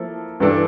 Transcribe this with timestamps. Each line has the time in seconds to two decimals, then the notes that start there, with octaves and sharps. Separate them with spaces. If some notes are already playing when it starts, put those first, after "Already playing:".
Already playing: F3 A#3 E4 A4
0.40 G2 E3 G3 D4 A4